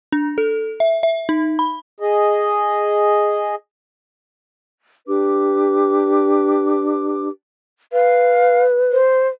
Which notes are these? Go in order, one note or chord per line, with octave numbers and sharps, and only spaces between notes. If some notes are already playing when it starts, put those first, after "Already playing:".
D4
A4
E5
E5
D#4
B5
G#4 D#5
D4 G4 B4 D6
B4 F5
C5